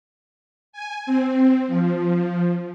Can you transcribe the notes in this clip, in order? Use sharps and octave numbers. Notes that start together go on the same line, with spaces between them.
G#5
C4
F3